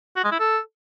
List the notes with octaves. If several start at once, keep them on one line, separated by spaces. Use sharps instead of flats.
F#4
G#3
E4
A4